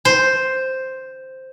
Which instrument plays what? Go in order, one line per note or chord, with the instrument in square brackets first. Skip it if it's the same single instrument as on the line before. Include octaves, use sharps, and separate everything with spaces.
[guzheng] C5